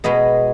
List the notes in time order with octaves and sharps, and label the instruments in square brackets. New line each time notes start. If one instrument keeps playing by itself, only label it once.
[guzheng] B2 G#3 B3 D#5